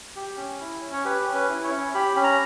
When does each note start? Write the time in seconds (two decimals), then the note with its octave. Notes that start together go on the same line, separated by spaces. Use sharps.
0.16 G4
0.37 C#4
0.60 E4
0.82 C#4
0.93 C#5
1.05 G4 B4
1.27 C#4
1.35 B4
1.49 E4
1.64 C#5
1.72 C#4
1.94 G4 B5
2.16 C#4 B5
2.24 A#5